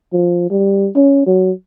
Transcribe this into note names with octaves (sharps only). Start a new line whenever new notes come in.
F3
G3
C#4
F#3